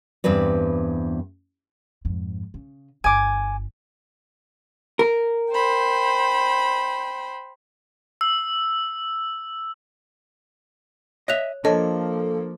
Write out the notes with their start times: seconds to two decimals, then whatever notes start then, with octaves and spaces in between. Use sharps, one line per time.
0.24 E2 G2 C4 B4 D5
2.05 F2 G#2
2.54 C#3
3.04 G1 F4 G#5 D6
4.99 A#4
5.52 C5 G5 B5
8.21 E6
11.28 C#5 D#5 E5 F#6 F7
11.65 F3 A#3 D4 A4 C#5 D#5